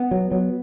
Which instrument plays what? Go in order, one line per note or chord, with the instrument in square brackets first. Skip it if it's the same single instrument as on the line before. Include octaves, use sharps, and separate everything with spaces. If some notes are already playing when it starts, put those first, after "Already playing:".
Already playing: [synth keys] B3
[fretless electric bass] F#3
F#3